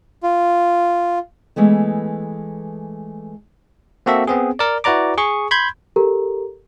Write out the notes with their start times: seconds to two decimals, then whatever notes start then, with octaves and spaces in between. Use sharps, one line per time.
0.23 F4
1.56 E3 G#3 A3 B3
4.06 A#3 C4 F#4 A4 E5
4.27 B3 C4 G#4
4.59 A#4 D5
4.84 E4 F#4 B4 D5 A#5 D6
5.18 G#4 C#6
5.51 B5 C6 G6 G#6
5.96 G4 A4 A#4 A#5